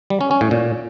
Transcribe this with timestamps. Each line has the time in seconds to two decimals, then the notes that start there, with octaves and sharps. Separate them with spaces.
0.10 G3
0.21 C#4
0.31 C#4
0.41 A2
0.51 A#2